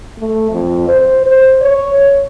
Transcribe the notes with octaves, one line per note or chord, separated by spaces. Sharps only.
A3
F2
C5
C5
C#5